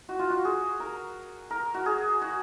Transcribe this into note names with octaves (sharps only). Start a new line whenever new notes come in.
F#4
F4
F#4
G#4
A#4
A#4
F#4
G#4
F#4